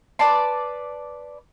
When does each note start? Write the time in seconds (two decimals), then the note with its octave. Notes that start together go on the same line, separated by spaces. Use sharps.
0.19 B4 D5 A5 C6